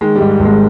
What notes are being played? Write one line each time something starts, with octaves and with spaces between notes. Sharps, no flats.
D#3 G#3
G#2 G3
G#1
G#3